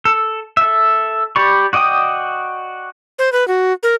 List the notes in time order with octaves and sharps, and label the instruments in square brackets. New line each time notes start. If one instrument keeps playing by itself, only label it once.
[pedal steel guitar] A4
A4 E5
G4 D5 B5 C#6
F#4 D5 D#5 G5 D#6
[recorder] C5
B4
F#4
A#4